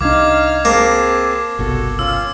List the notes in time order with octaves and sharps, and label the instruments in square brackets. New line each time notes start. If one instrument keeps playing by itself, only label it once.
[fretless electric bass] C2 D4 [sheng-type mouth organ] D#4 F5 F6 [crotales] D6 G#6
[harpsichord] A#3 [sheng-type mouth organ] C4 G#4 A5
[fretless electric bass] G1 C2 B2 [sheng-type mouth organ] F#4 A4
[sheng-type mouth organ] C#4 F4 [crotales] E6